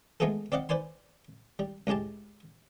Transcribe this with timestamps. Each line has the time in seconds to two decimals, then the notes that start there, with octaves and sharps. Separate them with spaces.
0.20 G#3 A3 B3 F4 G#4 A4
0.52 C4 D5 D#5 F5 F#5
0.69 B4 C5 D5 G#5 C6
1.59 G3
1.87 C#2 A2 G#3 G4 A5